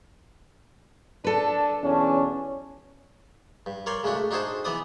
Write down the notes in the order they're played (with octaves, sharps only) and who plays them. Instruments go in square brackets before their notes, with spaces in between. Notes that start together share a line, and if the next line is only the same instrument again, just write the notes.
[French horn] D4 [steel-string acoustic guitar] A4 B4
[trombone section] B1 E2 C#4 [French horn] D4
[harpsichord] G2
A#4 C#5 D5 G5 C6
C#3 G#3 A3 D4 F#4
A3
D4 D#4 F#4 G#4 C5 A5
E3 B3 D5 D#6